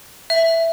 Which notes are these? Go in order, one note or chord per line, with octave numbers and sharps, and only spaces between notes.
E5